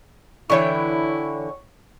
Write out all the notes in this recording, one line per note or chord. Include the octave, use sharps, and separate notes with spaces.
D3 E3 E4 C#5 G5 C#6